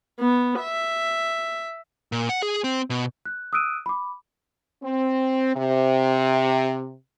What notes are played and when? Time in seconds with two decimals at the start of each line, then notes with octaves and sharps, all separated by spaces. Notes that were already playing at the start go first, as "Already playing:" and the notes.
0.20 B3
0.60 E5
2.12 A#2
2.29 F#5
2.42 G#4
2.64 C4
2.90 B2
3.25 F#6
3.53 D#6 E6 F#6 D7 D#7
3.86 B5 D6
4.83 C4
5.55 C3